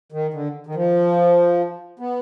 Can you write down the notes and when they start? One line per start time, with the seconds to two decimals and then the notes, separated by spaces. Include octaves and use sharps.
0.12 D#3
0.34 D3
0.67 D#3
0.75 F3
1.99 B3